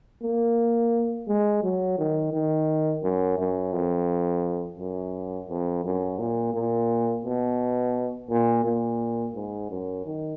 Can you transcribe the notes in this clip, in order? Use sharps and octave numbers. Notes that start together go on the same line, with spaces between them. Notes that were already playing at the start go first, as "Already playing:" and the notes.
A#3
G#3
F#3
D#3
D#3
F#2
F#2
F2
F#2
F2
F#2
A#2
A#2
B2
A#2
A#2
G#2
F#2
D#3